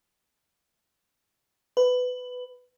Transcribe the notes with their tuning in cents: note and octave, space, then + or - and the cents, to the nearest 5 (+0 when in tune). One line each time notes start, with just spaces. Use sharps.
B4 +15